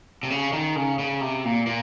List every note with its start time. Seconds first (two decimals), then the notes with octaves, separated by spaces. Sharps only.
0.23 C3
0.30 C#3
0.53 D#3
0.76 C#3
0.99 C#3
1.21 C3
1.45 A#2
1.67 A#2